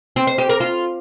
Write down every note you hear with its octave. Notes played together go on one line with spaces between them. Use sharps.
C4
C5
G4
A#4
F4